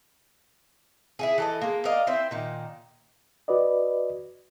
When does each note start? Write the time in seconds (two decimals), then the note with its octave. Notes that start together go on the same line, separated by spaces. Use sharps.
1.19 E4 F#4 G#4
1.38 E3 A4 D#5
1.62 G#3 A#3
1.85 A#4 D5 D#5 F5
2.07 C4 E4 C5
2.31 A#2 D#3
3.48 F#4 B4 D5 D#5